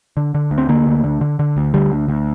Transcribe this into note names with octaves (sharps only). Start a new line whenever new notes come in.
D3
D3
D2
C4
D3 A#3
D2
D3
D3
D3
D2
D3 G3
D2
D2